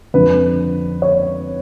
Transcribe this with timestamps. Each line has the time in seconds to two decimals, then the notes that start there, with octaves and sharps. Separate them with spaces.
0.14 F2 D3 F3 B4
1.02 C#5